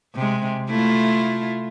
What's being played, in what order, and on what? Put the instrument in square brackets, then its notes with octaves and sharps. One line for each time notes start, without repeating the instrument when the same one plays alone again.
[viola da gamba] C3 G#3
A3 E4 F4